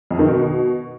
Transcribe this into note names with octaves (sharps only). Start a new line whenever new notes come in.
F2
D#3
B2